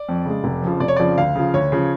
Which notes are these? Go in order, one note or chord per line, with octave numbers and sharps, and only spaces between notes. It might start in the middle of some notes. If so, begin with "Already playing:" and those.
Already playing: D5
F2
C#3 G#3
F1
F2 C#3 F3
F1 D5
C#5
F2 C#3 F3 D5
D2 F5
C#3 F3
D2 C#5
C#3 F3